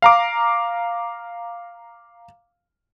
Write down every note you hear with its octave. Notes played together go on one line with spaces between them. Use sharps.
F5 A#5 D6